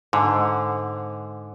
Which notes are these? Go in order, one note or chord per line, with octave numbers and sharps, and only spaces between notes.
G#2 D3 C4